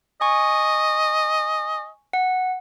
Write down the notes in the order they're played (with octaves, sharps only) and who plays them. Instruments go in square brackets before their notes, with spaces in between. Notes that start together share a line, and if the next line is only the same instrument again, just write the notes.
[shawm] D#5 [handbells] G#5 C#6
[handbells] F#5